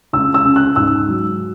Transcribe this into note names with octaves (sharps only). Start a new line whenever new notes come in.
C#2 E6
E6
C#3
F#6
G#2 E6
F#3